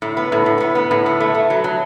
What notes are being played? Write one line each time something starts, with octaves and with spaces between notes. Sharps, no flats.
A2
B3
A2
A2
B3
B3
A2
B3
A3
A3
F#3
F#3